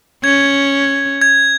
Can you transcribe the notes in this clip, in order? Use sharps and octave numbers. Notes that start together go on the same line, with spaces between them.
C#4 G#6
G#6